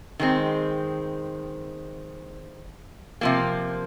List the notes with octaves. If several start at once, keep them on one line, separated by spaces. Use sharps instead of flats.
D#3 G#3 C4
C3 F3 A#3